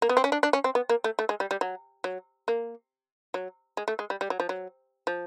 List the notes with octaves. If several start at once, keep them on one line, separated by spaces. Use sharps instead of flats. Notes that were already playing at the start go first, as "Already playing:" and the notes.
A#3
B3
C4
C#4
D4
D4
C#4
C4
B3
A#3
A3
A3
G#3
G3
G3
F#3
F#3
A#3
F#3
G#3
A3
G#3
G3
G3
F#3
F3
F#3
F3